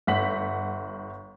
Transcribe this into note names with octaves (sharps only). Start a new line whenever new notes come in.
G1 F#5 B6 F#7